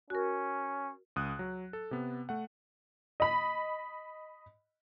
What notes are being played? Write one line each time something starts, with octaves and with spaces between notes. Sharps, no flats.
C#4 F#4 A#4
C#2 D#6 F#6
F#3
A4
C3 B3
A3 F#5
D#5 B5